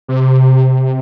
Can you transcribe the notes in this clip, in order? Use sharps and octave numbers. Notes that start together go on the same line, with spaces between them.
C3